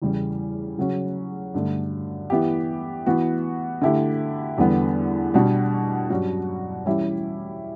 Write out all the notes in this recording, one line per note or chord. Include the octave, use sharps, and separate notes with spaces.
E2 C#3 E3 G3
C#3 F#3 C#4 F#4
G2 D3 A3
E3 B3 E4 G4
E3 B3 F#4
D3 A3 E4 G4
E2 D3 G3 B3
B2 G3 D4 F#4
G2 F#3 C#4 F#4
E3 G3 C#4 E4 G4